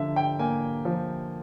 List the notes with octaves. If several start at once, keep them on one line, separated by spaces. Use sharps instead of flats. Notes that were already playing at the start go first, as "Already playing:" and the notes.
Already playing: D3 F3 E5
G5
A#3 G#5
F3